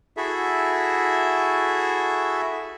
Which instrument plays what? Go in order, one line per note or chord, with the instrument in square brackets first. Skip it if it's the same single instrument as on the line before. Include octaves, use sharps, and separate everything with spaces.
[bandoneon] E4 F#4 G#4 A4 E5